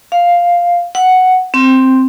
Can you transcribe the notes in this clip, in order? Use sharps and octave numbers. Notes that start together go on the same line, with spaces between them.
F5
F#5
C4